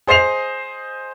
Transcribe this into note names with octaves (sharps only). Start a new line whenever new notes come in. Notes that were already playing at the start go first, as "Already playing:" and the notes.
G#4 C5 D#5 C7 F7